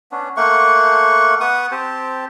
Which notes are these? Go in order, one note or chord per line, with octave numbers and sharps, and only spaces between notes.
B3 C#4 D4
A3 A#3 F#5 C#6
B3 F#5 C#6 D#6
C4 G4 C5 A5